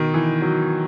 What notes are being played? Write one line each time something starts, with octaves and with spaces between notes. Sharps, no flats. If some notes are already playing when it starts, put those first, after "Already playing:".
Already playing: B2 D#3
E3
F#3